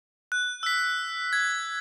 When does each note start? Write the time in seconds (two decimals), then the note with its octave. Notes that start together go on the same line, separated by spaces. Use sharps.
0.32 F#6
0.63 E6 B6
1.33 G#6